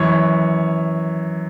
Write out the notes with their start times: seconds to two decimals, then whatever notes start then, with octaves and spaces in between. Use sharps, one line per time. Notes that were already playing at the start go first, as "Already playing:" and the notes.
Already playing: F#2 E3 C#5